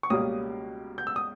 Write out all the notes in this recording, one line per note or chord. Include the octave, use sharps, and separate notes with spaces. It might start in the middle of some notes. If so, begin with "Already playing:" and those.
C#6
C#2 B2 G3 A#3 C#4 D#6
G6
E6
D#6